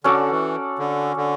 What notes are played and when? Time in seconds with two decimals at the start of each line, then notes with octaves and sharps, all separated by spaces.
0.04 D3 C#4 F#4 A4 D5
0.30 E3
0.79 D3
1.17 D3